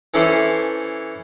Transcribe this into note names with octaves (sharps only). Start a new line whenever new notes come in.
E3 C#4 E4 A4 C5 D6